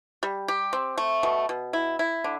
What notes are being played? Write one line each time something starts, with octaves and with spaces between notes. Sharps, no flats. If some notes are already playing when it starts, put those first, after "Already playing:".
G3
G4
C4
A3
B2
B2
E4
E4
D3